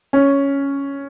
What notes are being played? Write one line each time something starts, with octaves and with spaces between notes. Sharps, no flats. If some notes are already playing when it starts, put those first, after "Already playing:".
C#4